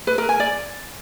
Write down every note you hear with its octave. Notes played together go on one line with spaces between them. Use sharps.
B4
A#4
G#5
D5